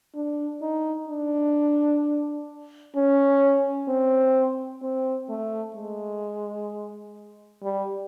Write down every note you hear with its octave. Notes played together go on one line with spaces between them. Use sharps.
D4
D#4
D4
C#4
C4
C4
A3
G#3
G3